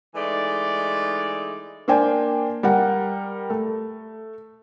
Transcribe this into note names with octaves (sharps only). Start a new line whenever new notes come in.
E3 G#3 A3 D#4 D5
A#3 D4 C5 G5 G#5
G3 A#4 F#5
A3